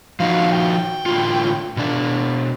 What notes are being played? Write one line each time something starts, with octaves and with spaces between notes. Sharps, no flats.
F3 D#4 F#4 F5
G5
A2 D3 F4
B2 D4